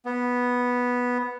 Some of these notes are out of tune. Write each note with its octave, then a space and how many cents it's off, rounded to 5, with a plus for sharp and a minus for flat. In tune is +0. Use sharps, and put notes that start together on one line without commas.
B3 -5